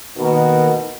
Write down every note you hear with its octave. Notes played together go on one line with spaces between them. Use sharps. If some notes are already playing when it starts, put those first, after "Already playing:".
B2 D#3 A#3 D#4 F#4 A#4